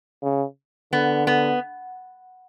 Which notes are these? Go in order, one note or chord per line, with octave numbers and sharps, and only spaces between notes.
C#3
D3 B3
B3